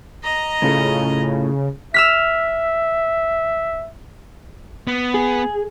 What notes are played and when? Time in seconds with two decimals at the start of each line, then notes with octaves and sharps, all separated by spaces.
0.23 D#5 A#5
0.62 A2 C#3 F4 A4
1.94 E5 E6 F6 B6
4.87 B3
5.14 G#4